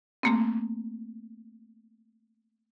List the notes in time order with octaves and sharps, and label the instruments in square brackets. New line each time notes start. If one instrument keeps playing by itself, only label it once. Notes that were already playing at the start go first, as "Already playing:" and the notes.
[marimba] A3 A#3 C4